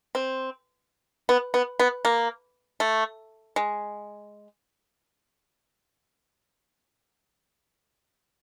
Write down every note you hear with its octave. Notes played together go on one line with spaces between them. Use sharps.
C4
B3
B3
B3
A#3
A3
G#3